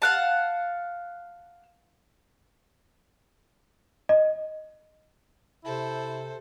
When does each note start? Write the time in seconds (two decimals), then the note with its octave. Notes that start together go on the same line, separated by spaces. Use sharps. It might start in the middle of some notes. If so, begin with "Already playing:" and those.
0.02 F5 F#5 A5
4.09 D#5
5.65 C3 E4 A4 C5